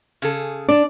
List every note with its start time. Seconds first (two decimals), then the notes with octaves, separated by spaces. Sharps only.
0.22 C#3 G#4 A4
0.69 D4 D5